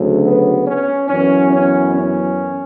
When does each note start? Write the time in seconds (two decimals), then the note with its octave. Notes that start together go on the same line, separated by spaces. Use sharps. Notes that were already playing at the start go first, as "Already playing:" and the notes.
Already playing: D2 C#3 F#3
0.25 B3
0.66 C#4
1.09 F#2 E3 B3 C#4
1.52 C#4
1.94 C#4